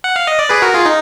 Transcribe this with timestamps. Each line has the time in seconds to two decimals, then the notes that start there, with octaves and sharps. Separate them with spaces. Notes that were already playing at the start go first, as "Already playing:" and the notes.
0.04 F#5
0.16 F5
0.27 D#5
0.39 D5
0.49 G#4 B4
0.62 F#4 A#4
0.74 F4 G#4
0.86 D#4